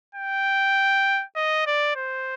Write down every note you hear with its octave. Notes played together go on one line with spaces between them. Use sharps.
G5
D#5
D5
C5